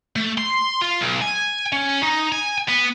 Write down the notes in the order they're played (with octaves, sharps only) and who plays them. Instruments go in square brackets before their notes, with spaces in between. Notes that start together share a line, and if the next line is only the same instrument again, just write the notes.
[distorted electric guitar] A3
C6
F4
B1
G#5
C#4
D#4
G#5
B3